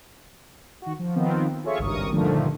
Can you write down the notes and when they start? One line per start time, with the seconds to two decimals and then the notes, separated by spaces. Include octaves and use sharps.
0.82 D#3 F#4
0.99 F3
1.16 D#3 F3 B3 C4
1.64 F4 G#4 A4 C#5 E5 C#6
1.79 G#1 C#2 G2 A#4 C#6 D#6
2.11 G2 A#2 D3 D#3 F3 A3